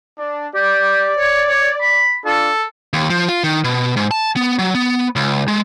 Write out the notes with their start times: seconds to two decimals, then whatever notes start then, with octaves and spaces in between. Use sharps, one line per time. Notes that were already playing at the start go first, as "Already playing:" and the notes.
0.18 D4
0.55 G4 D5
1.18 C#5
1.48 C#5
1.81 B5
2.26 D4 F4 A4
2.93 D#2
3.10 F3
3.29 F4
3.44 D#3
3.64 B2
3.96 G#2
4.11 A5
4.36 B3
4.59 F#3
4.75 B3
5.16 C#2
5.48 G#3